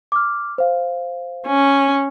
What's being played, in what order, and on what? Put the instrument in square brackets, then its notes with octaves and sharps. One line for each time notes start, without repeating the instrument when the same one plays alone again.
[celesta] D6 F6
C5 F5
[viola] C#4